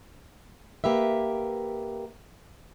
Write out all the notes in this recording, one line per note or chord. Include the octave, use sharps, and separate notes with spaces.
A#3 G4 B4 E5